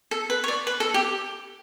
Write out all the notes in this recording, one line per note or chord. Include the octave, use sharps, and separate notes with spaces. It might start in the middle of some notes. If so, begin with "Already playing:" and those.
A4
B4
C#5
D5
B4
A4
G4